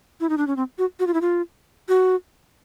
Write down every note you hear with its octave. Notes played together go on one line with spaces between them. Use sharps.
E4
D#4
D4
C#4
C4
F#4
F#4
F4
E4
F4
F#4